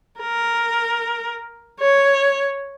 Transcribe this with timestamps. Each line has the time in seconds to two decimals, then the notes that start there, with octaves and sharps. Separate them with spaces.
0.21 A#4
1.80 C#5